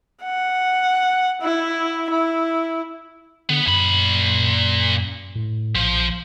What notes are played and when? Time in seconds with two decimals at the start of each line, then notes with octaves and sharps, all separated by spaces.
0.23 F#5
1.42 E4
2.10 E4
3.49 D3 B3
3.67 F#2 A#2 B5
5.35 A2
5.75 A#1 F3